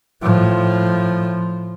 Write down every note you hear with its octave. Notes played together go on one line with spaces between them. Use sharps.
A2 F3